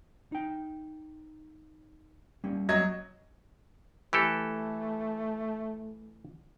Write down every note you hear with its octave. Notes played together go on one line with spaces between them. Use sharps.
D#4 G5
G3 A#3 C#4
F#3 D#5 G#6
E3 A3 G4 A4